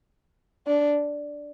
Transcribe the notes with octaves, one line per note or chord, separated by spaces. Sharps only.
D4